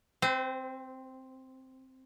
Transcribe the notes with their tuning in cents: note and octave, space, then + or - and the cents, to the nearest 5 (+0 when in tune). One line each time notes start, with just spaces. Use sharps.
C4 +0 C5 -40